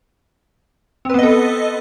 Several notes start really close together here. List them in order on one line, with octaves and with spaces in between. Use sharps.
C4 B4 B3 D#5 A4